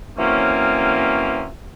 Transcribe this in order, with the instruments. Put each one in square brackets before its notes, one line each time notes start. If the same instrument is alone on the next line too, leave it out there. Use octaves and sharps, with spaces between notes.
[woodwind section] E3 F#3 A#3 C4 C#4